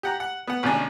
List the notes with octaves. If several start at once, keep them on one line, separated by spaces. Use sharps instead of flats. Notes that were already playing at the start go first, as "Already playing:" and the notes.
G4 F#5 A#5
F#5
B3 F#5
G#1 D#2 C3 C#4 D4 G#5